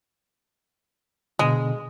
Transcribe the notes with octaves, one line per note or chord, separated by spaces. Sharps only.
B2 D3 G#3